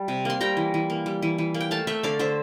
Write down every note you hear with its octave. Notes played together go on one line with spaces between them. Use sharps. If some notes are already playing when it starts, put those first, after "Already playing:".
Already playing: G3
C3
A#3 C6
G3 G5 A#5
E3
E3
A#3
G3
E3
E3
A#3
G5
A3 F5 A5
A3 E5 G5
D3 D5 F5
D3 C5 E5